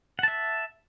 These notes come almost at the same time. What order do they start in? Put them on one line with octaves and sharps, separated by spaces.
F#5 A5 E5